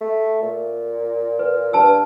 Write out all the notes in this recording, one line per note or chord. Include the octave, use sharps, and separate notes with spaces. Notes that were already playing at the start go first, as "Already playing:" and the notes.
A3
A#2
B4
G2 B4 A5 E6